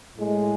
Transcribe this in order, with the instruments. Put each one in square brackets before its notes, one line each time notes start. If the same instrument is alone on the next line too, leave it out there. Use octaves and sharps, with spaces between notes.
[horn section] A2 G#3